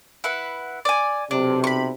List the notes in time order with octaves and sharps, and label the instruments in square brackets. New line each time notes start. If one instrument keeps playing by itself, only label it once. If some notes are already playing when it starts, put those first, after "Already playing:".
[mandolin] E4 B4 F#5
D5 G#5
[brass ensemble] B1 C3 [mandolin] D4
[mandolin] B5 C#6